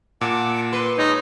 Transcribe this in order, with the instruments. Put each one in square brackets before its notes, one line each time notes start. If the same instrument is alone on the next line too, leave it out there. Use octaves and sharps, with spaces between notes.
[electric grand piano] A#2 [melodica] F#5 A5 D6
[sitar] B4 [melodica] C6
[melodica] G#3 C#5 [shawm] D#4